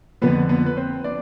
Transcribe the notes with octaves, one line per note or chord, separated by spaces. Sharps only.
F2 D3 F3 B3 B4
B3 B4
B4
C4 C5
D4 D5